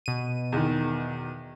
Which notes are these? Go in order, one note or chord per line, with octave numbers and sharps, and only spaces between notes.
B2 D#7
E2 D#3